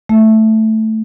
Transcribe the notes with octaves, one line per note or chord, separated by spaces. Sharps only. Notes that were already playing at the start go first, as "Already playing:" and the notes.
A3